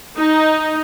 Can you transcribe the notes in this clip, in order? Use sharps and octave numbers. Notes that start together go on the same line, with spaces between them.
D#4